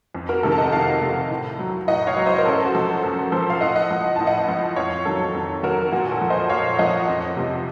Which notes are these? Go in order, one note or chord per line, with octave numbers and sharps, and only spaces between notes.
F2
F#4 A#4
C3 D#3 A4
A5
D#5 F#5
F2 F5 A5
C3 D#3
A2
F#3
A2 D#5 F#5
C#5 F5
F#3
C5 D#5
A#4
F#2 A4 C5
F#4
F3 A4
F#2 A4
F3 A4 C5
F5
A2 D#5 F#5
D#5 F#5
F3
F#5
A2 A5
D#5 F#5
F3
F2 C#5 F5
D#3 F#3 A4
F2
D#3 F#3 F#4 A#4
A#2 F#4
A4
F3
C5 D#5
A#2 C#5 F5
F3 D#5 F#5
F2
C3 F3